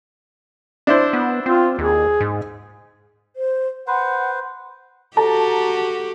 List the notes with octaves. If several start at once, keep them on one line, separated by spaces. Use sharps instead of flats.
D4 E4 C5
B3
C4 F4
D#2 G#4
G#2
C5
B4 C5 F#5
F#4 G4 A4 A5 A#5